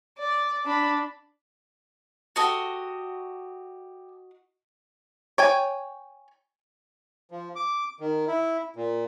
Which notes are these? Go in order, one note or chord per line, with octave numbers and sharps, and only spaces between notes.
D5
D4 B5
F#4 G4 A4 A#4 D#5
C#5 G5 G#5
F3
D6
D#3
E4
A#2